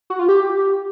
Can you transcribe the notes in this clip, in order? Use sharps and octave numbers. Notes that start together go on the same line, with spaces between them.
F#4
F4
G4